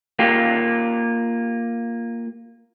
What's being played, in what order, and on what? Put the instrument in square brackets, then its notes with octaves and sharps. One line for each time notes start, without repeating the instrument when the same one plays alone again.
[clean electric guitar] A#3 F4 G4